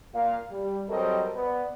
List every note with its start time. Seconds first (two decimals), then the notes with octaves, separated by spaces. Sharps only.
0.15 A#2 F5
0.51 G3
0.89 F#3 G3 C4 A4 A#4 D#5
1.36 B3 D5